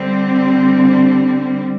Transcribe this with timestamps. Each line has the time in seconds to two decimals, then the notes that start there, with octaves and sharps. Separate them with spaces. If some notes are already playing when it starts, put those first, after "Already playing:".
Already playing: D3 G3 C4